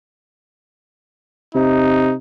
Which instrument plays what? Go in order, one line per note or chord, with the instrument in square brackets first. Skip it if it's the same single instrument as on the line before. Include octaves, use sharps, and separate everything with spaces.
[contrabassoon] C3 [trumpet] D#4